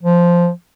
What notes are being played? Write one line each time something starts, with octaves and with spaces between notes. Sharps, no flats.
F3